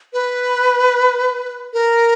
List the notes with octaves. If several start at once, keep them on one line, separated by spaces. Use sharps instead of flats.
B4
A#4